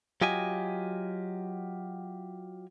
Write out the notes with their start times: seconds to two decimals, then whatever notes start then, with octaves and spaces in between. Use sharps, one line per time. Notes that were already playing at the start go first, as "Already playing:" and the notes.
0.21 F#3 F4 G4 D#5 G#5